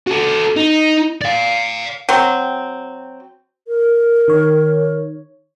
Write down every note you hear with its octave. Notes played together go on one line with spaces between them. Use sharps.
F#4 A4
D#4
D5 F5
F#3 C4
A#4
D#3 C#5